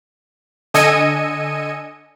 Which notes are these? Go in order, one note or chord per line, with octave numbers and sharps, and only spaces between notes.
D3 D#5 G#5 E6 C#7 D#7